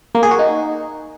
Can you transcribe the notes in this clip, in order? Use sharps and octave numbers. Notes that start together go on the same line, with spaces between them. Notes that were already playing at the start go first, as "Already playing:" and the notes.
A#3
G#4
F#4
D#4